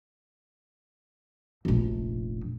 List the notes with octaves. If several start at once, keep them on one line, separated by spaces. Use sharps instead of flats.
F1 A#1